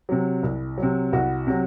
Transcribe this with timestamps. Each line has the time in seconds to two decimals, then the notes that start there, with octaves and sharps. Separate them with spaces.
0.09 C3 F#3
0.43 C2
0.77 C3 F#3
1.13 C2 F#4
1.47 C3 F#3